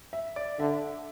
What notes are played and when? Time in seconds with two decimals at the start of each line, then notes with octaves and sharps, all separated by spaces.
0.13 E5
0.36 D5
0.59 D3 E5